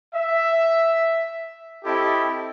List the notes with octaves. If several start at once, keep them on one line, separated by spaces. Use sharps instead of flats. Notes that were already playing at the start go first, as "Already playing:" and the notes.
E5
C4 E4 G4 A4 D#5 A5